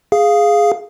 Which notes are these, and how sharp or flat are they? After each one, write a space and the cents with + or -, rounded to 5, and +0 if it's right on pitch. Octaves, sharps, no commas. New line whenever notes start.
G#4 +0 F5 +0